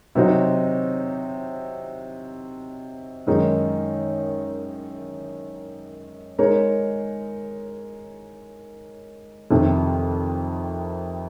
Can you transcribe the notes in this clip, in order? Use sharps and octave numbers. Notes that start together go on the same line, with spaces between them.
C3 F#3 C4 D#4 F#4
F#2 D#3 G#3 D#4 A#4
G#3 D#4 A#4 C#5
F2 C3 D#3